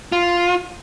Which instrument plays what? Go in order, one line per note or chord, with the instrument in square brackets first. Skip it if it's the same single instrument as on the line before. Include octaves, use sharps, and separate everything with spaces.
[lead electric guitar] F4